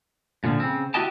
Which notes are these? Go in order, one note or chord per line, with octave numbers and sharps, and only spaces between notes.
A#2 D3 F3
C#3 C4
E4 F#4 G4 D#5 G5 A5